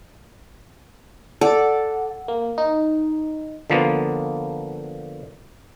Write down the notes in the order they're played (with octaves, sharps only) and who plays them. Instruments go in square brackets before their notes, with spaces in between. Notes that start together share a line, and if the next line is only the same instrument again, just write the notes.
[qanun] A4 D5 [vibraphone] F#5
[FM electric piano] A#3
D#4
[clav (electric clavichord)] D3 F3 A#3 B3